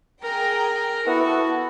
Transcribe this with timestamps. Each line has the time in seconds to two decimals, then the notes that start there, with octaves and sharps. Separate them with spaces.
0.23 G#4 A#4 G5 A#5
1.07 B3 E4 F#4 A4